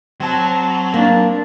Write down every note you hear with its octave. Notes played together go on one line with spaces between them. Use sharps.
F#3 C4 A5
A#3 D4